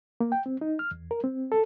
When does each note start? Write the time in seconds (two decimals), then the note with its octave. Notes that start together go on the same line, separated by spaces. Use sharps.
0.20 A#3
0.32 G5
0.46 C4
0.61 D#4
0.79 F6
0.91 E2
1.11 A#4
1.24 C4
1.52 A4